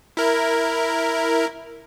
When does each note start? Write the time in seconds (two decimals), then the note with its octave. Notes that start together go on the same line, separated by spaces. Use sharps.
0.17 E4 A#4